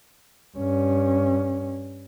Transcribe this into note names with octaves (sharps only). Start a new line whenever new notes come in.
G2 C#4